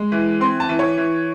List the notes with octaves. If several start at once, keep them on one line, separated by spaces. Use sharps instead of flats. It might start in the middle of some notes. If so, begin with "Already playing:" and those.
Already playing: G#3
E3
C4 C6
A5
E3
C#5
E3